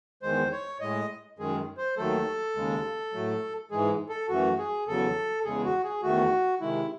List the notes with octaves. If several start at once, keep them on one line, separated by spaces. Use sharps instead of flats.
E2 D#3 G#3 C5
C#5
A2 G#3 D#5
F#2 D#3 G#3 G#4
C5
D#2 D#3 F#3 A3 A4
D#2 C#3 G#3
A2 F#3 A3
G#2 E3 G#3 G#4
A4
F#2 E3 A3 F#4
G#4
E2 C#3 F#3 A4
E2 C#3 G#3 G#4
F#4
G#4
E2 D#3 A3 F#4
C3 D#3 G#3 E4